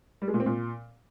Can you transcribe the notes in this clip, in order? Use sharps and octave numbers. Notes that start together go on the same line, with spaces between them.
G3
G#3
A#2
C4
A#2